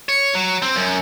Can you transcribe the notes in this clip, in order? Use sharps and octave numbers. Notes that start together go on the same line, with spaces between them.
C#5
F#3
C4
F#2